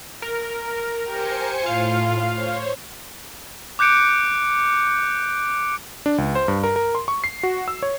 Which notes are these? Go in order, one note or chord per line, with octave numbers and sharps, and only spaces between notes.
A#4
G4 C5 G#5 C#7
A2 F4 F5
C5 C#5
D6 F#6 G6 C#7 D7
D4
C#2
C5
G2
A#4
A#4
C6
C#6
C7
F#4
E6
C#5